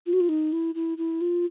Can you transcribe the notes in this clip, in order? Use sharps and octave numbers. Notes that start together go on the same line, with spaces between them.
F4
F#4
F4
D#4
E4
E4
E4
F4